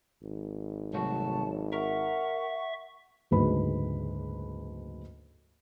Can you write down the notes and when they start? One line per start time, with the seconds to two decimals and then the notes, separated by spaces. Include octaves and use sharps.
0.23 G#1
0.94 C2 F#3 A3 F#4 A5
1.73 A#4 E5 F#5 C#6
3.31 F#1 D2 G#2 B4 B5